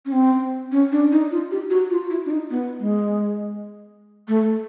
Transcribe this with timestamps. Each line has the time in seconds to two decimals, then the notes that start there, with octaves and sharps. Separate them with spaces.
0.06 C#4
0.12 C4
0.72 C#4
0.92 D4
1.11 D#4
1.31 F4
1.51 G4
1.70 F#4
1.91 F4
2.10 E4
2.25 D4
2.31 D#4
2.50 B3
2.80 G#3
4.28 A3